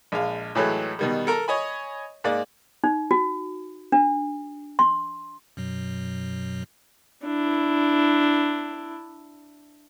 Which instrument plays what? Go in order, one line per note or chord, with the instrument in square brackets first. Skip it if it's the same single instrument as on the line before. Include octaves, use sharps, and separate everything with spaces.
[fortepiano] A#1 G#3 F5
A2 E3 F#3 G#3 A3
B2 D#3 G3
A4 A#4 A#5
C#5 D#5 G#5 B5
G#2 A#3 D5
[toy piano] D#4
F#4
D4
C6
[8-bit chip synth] F#2 B2 F#3
[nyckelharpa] D4 E4